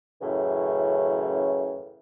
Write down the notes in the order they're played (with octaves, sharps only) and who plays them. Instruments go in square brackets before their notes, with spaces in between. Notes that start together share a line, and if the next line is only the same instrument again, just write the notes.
[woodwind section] F#2 A2 C#3 E3